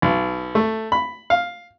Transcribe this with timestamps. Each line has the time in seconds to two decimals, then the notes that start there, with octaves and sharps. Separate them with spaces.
0.02 B1
0.55 A3
0.92 B5
1.30 F5